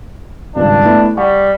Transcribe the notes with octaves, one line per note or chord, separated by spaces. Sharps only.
G#1 C#2 G2 D4
A3 B3 E4
G3 F#5 C#6